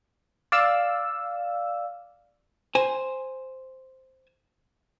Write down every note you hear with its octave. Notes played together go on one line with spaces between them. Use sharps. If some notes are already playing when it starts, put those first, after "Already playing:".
D5 F5 E6
C5 G#5